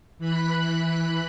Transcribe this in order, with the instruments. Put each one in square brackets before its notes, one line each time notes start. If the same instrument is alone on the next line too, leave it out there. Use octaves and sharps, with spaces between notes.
[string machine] E3 B5 F#6